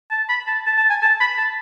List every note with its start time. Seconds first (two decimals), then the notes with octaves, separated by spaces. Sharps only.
0.11 A5
0.29 B5
0.47 A5
0.66 A5
0.77 A5
0.90 G#5
1.02 A5
1.20 B5
1.37 A5